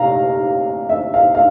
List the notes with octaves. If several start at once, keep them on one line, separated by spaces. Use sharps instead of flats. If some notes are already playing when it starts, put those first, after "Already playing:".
Already playing: C3 F5 A#5
E5
F5
F5